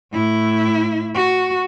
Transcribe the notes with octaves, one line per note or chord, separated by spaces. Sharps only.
A2 E4
F#4